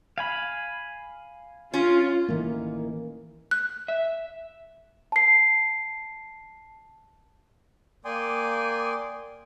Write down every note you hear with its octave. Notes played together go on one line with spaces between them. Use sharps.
F5 G#5 B5
C#4 F4
A1 D#3 E3 A#3
F#6
E5
A5 C7
A#3 D5 G5 G#5 C6 D#6